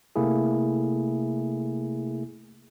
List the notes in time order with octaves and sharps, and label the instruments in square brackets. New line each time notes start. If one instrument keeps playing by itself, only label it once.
[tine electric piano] C3 A3 A#3 E4 G#4